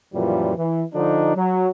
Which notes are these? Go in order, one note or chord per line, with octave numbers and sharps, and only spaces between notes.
F#2 A#2 E3 F3 G3
E3
D3 F3 D4 D#4
F#3